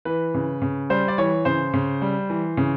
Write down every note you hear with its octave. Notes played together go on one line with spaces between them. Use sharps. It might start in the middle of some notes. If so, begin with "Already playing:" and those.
E3 B4
C#3
C#3
G3 C5
D5
E3 C#5
C#3 C5
C#3
G3
E3
C#3